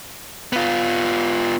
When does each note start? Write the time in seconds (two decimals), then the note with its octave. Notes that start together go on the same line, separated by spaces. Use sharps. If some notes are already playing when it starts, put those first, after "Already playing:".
0.53 B3 F4